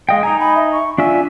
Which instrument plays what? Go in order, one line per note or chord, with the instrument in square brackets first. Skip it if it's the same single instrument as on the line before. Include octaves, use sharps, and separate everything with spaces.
[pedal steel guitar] G#3 D#5 G5 [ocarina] F5
[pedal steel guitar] D#4 D#5 G#5 [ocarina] A#5
[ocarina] B5
E5
C#6
[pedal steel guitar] D4 F4 E5 [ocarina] G#5